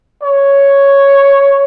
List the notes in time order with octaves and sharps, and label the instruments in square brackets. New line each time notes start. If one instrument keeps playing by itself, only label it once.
[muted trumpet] C#5